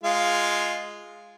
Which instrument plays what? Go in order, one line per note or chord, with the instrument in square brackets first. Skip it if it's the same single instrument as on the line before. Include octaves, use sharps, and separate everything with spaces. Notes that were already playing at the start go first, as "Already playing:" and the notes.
[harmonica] G#3 F4 F5